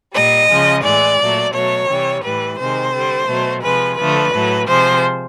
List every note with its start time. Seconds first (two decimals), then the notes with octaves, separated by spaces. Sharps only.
0.14 A#2 G3 D#5
0.49 C#3 F3 G#3
0.84 A2 E3 G#3 D5
1.19 A#2 F#3 A3
1.53 B2 F#3 A3 C#5
1.88 C3 E3 G3
2.23 A2 E3 G3 B4
2.58 C3 D#3 G#3 C5
2.93 D3 G3
3.28 B2 F#3 A3
3.63 C3 F3 G#3 B4
3.98 D3 F3 A3 B4
4.33 A2 F#3 A3
4.68 C3 F3 G#3 C5